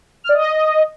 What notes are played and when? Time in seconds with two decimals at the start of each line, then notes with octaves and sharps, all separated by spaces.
0.24 F6
0.29 D5
0.34 D#5